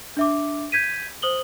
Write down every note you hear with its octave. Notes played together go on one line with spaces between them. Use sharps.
D4 E5 D6
G6 G#6 B6 D#7
C5 D#6 F#7 G7